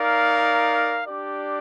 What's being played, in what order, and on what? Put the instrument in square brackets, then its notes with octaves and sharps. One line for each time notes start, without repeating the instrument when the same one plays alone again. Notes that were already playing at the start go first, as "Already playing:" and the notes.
Already playing: [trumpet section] D#4 A#4 D5 F5
D4 G4 D5